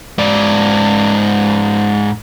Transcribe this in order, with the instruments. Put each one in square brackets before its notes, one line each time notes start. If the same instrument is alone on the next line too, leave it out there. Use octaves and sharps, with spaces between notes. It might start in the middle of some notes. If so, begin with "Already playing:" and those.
[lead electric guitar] G#2 D5